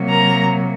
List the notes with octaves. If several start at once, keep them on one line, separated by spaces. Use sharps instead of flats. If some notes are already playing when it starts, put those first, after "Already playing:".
Already playing: C3 F#3 A#3
A#4 A#5